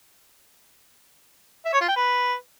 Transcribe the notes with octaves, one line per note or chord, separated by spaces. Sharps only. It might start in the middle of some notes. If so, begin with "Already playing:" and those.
E5
C#5
F4
G5
B4